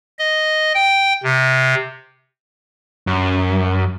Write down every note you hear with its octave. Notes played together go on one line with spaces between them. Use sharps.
D#5
G5
C3
F#2